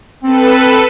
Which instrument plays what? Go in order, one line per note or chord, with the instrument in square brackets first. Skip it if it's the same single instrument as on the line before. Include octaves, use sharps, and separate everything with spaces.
[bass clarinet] C4 [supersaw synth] A4 B4